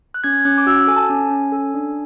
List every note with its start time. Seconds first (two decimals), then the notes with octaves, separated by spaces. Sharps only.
0.14 F#6
0.24 C#4 G#6
0.40 G#6
0.45 C#4 F#6
0.58 D6
0.66 F#4 E6
0.88 A4 G#5
0.97 A5
1.04 G#5
1.10 C#4
1.30 C#4
1.52 A4
1.74 D4